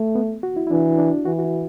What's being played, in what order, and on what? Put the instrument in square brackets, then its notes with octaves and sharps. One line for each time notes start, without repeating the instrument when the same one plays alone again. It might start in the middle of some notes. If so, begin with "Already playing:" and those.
Already playing: [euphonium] A3
[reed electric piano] B3
F#4
E4
E4
[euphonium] E3 [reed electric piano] D4
[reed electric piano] D4
[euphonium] E3 [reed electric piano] F#4
[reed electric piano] F#4
E4